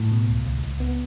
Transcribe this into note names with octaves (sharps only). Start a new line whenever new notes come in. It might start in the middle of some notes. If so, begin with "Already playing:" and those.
Already playing: A2
B2
C#2
C#2
C#2
B3